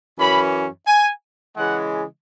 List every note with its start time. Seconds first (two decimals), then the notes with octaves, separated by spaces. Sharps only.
0.18 F#2 E3 C#4 B5
0.87 G#5
1.57 C#3 E3 G#3 F#5